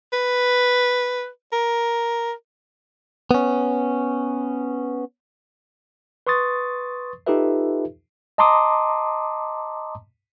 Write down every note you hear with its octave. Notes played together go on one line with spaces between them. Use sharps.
B4
A#4
B3 C#4
B4 C6 C#6 D#6 A6
D#4 F4 G4 A4 B4 E5
D#5 A5 A#5 C6 D6 D#6